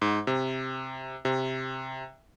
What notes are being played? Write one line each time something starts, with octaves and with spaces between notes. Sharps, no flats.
G#2
C3
C3